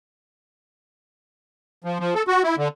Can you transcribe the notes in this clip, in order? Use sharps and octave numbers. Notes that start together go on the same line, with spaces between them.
F3
F3
A4
F#4
E4
D3